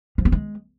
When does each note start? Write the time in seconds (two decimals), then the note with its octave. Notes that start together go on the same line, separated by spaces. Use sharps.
0.18 F3
0.25 B3
0.32 G#3